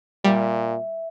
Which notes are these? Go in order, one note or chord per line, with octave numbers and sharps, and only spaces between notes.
A#2 G3 E5